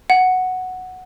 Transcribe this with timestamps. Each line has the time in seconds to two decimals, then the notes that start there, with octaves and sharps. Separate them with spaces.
0.10 F#5